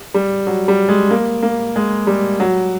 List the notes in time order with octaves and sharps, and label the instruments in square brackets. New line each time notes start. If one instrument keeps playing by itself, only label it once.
[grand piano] G3
F#3
G3
G#3
A#3
A#3
G#3
G3
F#3